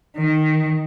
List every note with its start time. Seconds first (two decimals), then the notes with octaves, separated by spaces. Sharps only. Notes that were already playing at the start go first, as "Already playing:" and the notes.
0.17 D#3